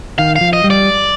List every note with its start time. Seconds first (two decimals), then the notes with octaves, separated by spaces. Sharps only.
0.18 D#3 F5
0.36 F5
0.41 F3
0.53 D#5
0.64 G3
0.70 D5